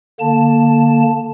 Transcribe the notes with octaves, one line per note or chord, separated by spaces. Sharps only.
D3 A#3 A5